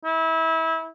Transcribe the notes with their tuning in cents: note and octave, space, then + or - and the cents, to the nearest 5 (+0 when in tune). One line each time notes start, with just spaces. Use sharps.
E4 -25